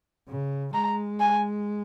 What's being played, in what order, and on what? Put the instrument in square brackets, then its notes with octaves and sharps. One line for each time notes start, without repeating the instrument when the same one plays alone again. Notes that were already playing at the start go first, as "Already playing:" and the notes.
[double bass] C#3
[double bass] G#3 [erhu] A#5
[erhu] G#5